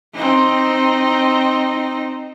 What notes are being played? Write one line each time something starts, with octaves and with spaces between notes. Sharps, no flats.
C4 D#4